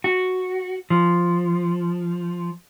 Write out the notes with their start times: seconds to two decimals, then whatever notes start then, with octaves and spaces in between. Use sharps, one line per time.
0.04 F#4
0.90 F3